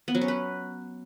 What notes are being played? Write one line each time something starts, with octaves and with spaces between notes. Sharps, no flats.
B3
F#3
C#4
B4